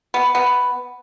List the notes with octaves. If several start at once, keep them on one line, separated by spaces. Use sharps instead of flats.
B3
B3